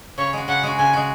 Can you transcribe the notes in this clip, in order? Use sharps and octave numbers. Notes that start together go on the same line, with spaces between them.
C#3 C#5
G#3 F#4
C#3 F#5
G#3 F#4
C#3 G#5
G#3 F#4